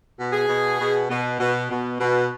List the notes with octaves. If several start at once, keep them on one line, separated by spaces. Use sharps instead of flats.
B2
G#4
B2
B2
B2
B2
B2
B2